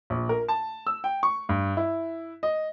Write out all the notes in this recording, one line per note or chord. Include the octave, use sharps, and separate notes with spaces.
A#1
A#4
A5
E6
G5
C#6
G2
E4
D#5